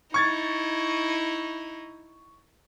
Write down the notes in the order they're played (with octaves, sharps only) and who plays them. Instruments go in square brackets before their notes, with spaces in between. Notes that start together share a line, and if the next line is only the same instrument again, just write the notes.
[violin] D#4 E4 [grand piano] C#6 G#6 A6